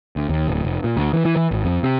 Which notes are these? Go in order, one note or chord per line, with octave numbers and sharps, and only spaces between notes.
D2
D#2
D1
F1
A#2
D2
E3
E3
E3
G#1
F2
C3